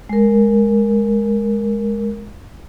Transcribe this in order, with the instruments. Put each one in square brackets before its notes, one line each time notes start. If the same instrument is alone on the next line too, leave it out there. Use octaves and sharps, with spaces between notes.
[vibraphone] G#3 A#4